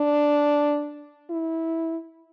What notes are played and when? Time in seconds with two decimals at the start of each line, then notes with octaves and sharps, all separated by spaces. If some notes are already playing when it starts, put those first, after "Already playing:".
Already playing: D4
1.30 E4